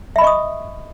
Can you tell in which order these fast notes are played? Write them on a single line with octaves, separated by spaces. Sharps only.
E5 B5 D#5 C#6 D#6